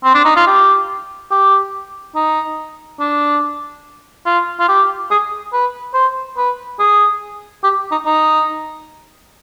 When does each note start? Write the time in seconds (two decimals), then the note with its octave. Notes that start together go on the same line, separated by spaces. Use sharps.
0.04 C4
0.15 D4
0.25 D#4
0.36 F4
0.47 G4
1.31 G4
2.15 D#4
3.00 D4
4.26 F4
4.60 F4
4.69 G4
5.11 G#4
5.53 B4
5.94 C5
6.37 B4
6.80 G#4
7.64 G4
7.92 D#4
8.06 D#4